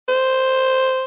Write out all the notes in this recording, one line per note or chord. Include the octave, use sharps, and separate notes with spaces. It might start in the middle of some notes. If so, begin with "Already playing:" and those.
C5